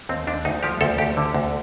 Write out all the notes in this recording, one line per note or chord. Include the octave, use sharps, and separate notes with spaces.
D#2 C4
D#2 D4
D2 D#4
F3 G4
D2 A4
D2 G4
D3
D2